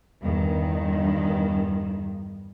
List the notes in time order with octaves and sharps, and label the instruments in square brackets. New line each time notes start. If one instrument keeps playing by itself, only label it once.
[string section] E2 G2 D#3